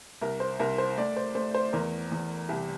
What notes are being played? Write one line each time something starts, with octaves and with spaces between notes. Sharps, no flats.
C2 A#4
C5
C2 A#4
C5
A3 D5
C5
A3 C5
C5
E2 A#4
E2
C2 G4